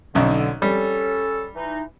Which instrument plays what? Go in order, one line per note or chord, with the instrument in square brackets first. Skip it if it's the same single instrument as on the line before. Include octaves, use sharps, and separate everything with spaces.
[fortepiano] B1 C#4 D#4 [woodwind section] D3
[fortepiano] G3 [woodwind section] C#4 A4
[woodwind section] E3 D#4